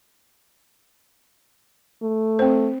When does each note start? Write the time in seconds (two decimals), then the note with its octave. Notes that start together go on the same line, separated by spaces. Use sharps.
2.02 A3
2.39 C4 C5